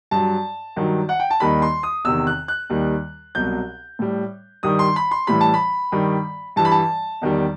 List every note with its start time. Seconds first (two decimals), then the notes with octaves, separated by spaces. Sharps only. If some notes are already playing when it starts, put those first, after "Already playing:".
0.11 G2 F#3 A5
0.76 G2 D#3 F#3
1.09 F#5
1.20 G5
1.30 A5
1.40 D#2 D#3 G3 B5
1.62 C6
1.83 D#6
2.05 E2 C3 D#3 E6
2.27 F#6
2.48 F#6
2.70 D#2 D#3 G3
3.35 C2 B2 F#3 G6
3.99 A2 G3
4.63 G2 D#3 G3 D#6
4.79 C6
4.96 B5
5.11 C6
5.27 A2 E3 G3 B5
5.41 A5
5.54 B5
5.92 G2 D#3 G3
6.56 G2 E3 G3 A5
6.65 B5
6.71 A5
7.21 E2 D#3 G3